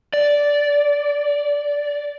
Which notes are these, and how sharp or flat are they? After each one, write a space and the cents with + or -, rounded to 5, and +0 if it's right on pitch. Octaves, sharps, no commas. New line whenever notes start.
D5 -10